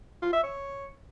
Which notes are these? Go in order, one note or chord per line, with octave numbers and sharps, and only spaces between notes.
F4
E5
C#5